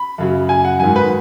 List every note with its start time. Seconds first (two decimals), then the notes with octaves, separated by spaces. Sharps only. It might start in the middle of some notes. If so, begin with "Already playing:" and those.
Already playing: B5
0.18 F#2 C#3 F#3
0.49 G#5
0.65 F#5
0.80 G#2 D#3 F#3 G#5
0.96 B4